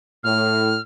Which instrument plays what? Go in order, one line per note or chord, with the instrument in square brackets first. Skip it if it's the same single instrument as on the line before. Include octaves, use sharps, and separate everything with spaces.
[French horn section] A2 [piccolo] F6